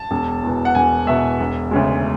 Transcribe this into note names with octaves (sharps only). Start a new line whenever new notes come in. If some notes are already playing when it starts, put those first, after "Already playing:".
Already playing: A5
E1
E2 B2
F#5
E1 G#5
E2 B2 E5
E1
D2 C#3 G#3